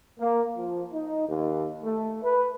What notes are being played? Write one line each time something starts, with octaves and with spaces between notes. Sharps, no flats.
A#3
F3
D#4
D#2
A3
B4